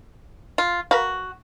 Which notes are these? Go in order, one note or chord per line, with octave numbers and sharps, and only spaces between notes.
F4
F#4 A#4 B4 F5